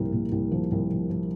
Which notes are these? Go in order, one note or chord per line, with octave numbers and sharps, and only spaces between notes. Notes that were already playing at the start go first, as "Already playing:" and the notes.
Already playing: C2 A#2 F3 A#4
A#2
C2
F3
C2
F3
F3